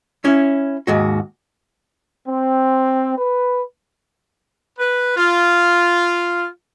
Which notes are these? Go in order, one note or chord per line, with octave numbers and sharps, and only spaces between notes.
C#4 E4
D#2 G#2 F#4
C4
B4
B4
F4